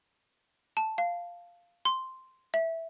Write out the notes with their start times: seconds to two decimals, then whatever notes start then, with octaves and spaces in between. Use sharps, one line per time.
0.77 A5
0.98 F5
1.85 C6
2.54 E5